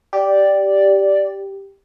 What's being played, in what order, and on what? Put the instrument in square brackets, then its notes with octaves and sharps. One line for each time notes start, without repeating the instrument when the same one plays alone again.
[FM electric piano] G4 [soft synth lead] D5